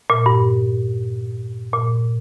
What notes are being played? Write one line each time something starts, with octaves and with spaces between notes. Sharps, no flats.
A#2
G2
A#2